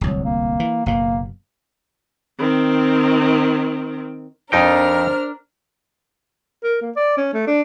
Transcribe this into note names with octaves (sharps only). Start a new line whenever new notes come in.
D1 C2 F#3
A#3
E3
F#1 B2 A#3
D#3 C4
F2 D4 D#4 A#4 C5 G5 F6
A#4
A#3
D5
C#4
A3
D4